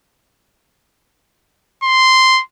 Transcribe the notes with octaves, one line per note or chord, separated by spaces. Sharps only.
C6